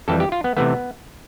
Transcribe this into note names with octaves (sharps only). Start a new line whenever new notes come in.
F2 E3 G3 A4
G4
F4
B3
C3 E3 A3 B3